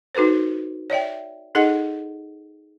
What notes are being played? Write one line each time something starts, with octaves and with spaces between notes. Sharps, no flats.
D#4 F#4 A4 B4 C5
C#5 D5 E5 G5
D#4 G#4 A4 D#5 F#5